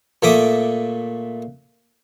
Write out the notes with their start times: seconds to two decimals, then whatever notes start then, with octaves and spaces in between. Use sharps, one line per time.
0.23 A#2 A3 E5 D6 D#6